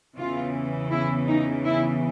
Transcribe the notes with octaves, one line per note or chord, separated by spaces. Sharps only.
E2 C#3 E3 F4
E4
D#4
E4